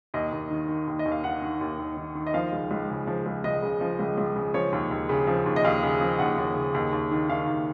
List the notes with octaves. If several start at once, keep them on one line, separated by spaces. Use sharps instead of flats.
D#2 D#5
D#2
D#3
D#3
D#2
D#5
D#2
F5
D#3 F#5
D#3
D#2
D#2
D#3
D#3
D#5
F3 F5
C#2
C#2
C#3
F3
C#2
C#2 D#5
C#3
F3
C#2
C#2
C#3
F3 C#5
D#2
D#2
C#3
F3
D#2
D#5
D#2 F5
C#3
F3
D#2 F#5
D#2
C#3
D#2
D#2
D#3
D#3 F5
D#2